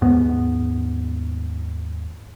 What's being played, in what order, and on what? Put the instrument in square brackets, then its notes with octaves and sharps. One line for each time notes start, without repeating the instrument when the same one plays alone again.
[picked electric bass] D#2 G#2 B3